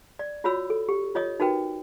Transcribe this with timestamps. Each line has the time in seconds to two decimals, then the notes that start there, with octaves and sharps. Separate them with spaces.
0.19 D5
0.44 F4 F#4 C#5 B5 E6
0.70 A4
0.89 G4
1.15 F4 C#5 D#5 D#6
1.40 D#4 F#4 A#4 B4 G5